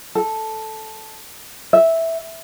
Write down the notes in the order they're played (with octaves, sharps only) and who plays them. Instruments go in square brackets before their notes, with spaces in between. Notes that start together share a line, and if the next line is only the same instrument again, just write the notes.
[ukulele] A4
E5